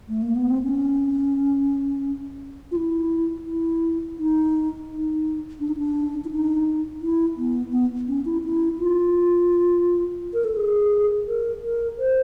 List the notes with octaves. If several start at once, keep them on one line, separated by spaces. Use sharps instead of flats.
A3
A#3
B3
C4
C#4
F4
E4
E4
D#4
D#4
D4
D#4
D4
E4
D#4
E4
B3
B3
C#4
E4
E4
F4
A#4
A4
G#4
A#4
A#4
C5